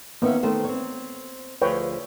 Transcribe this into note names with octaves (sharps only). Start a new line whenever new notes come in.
D#3 A#3 B3 C#4 E5
D#3 A3 C5
C4 C#5
D2 F3 G#4 B4 C#5 G5